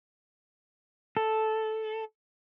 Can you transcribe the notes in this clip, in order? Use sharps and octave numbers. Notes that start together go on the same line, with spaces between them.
A4